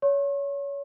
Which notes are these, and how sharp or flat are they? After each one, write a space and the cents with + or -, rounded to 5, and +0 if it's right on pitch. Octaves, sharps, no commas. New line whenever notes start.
C#5 +25 C#6 -45